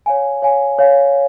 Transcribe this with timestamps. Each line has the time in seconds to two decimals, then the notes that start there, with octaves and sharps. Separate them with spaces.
0.06 C#5 F5 G#5
0.42 C#5 F5 G#5
0.79 C#5 F5 G#5